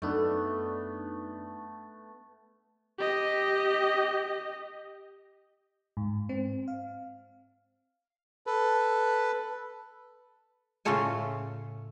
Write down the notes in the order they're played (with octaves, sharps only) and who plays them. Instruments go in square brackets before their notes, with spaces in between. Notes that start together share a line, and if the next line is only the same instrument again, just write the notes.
[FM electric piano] F#2 D4 D#4 [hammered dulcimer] A3 B3
[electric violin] G4 D#5
[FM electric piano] G#2
C4
F5
[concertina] A4 B4
[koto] A2 C#3 C#4 F4 A4 G#5